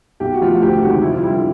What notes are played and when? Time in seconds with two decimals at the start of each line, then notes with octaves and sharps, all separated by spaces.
0.20 B1 G4
0.34 F#4
0.41 A2 F3 F4
0.48 F#4
0.62 D2 G4
0.82 C3 D#3 G#3 F#4
1.02 F2 E4
1.13 F4
1.23 G3 E4
1.26 D3